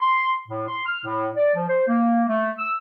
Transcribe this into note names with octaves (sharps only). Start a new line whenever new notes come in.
C6
A2
C6
F6
A2
D5
F3
C5
A#3
A3
E6